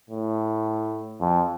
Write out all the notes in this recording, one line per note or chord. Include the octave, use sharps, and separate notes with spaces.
A2
F2